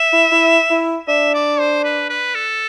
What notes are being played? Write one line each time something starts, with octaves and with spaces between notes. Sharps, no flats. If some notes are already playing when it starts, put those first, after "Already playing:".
Already playing: E5
E4
E4
E4
D4 E5
D5
C5
B4
B4
A4